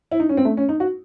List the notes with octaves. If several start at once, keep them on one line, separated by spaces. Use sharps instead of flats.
E4
D#4
C#4
C4
A3
C#4
D#4
F#4